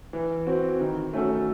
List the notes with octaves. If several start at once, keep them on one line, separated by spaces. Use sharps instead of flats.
E3
C4 F#4
D#3
A3 C#4 F#4 A4